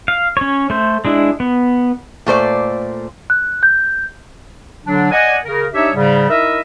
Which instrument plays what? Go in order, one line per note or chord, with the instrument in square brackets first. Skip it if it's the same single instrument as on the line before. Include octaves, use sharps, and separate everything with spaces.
[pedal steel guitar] F5
C#4 C#5
A3 C5
G#3 D4 E4
B3
[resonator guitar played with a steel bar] A#2 A3 C5 D5
[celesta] F#6
G6
[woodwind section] D3 F#3 D4
D5 D#5 F#5 G#5
C#3 A#4
D4 D#4 G4 C#5 E5
G#2 C#3 G3
D#4 E4 A#4 D#5 E5